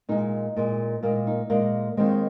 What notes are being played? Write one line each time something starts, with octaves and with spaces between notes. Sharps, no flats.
A#2 G#3 D#4
A#2 G#3
A#2 G#3 A#3
D#4
A#2 G#3 A#3
D#2 D#3 G#3 C4